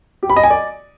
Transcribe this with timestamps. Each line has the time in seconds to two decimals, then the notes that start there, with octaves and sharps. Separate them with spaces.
0.23 G4
0.30 B5
0.36 D#5
0.43 G#5
0.50 D5